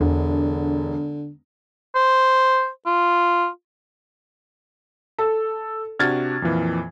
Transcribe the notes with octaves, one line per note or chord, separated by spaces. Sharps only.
E1 E2 D3
C5
F4
A4
C3 D4 F#4 F6 G#6 A6
F2 A#2 E3